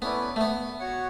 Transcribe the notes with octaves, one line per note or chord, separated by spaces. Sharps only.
A3 B3 C#4 E4 B4 D5
A3
B3
F#4 C#5 F#5